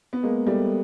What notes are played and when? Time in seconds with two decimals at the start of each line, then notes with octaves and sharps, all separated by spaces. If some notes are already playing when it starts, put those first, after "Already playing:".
0.13 B3
0.23 G#3 A#3
0.47 G3 A3